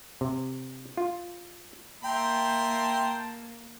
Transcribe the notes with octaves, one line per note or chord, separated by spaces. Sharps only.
C3
F4
A#3 E5 G5 A5 A#5 C6